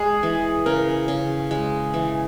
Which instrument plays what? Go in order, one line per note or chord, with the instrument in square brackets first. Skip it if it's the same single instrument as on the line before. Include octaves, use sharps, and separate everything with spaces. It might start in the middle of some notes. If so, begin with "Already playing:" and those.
Already playing: [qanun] G#3 [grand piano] G#4
[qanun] E3
[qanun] C#3 [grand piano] A#4
[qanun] C#3
G#3
E3